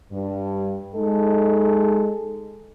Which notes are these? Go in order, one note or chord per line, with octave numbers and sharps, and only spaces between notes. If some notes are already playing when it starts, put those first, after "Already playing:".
G2
G#3 D#4 A4